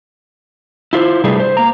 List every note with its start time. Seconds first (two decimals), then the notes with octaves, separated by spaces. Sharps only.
0.93 E4 F4 B4 C5
1.24 C3 G3 A3 D4 G#4 B4
1.40 C5
1.57 A#3 A#5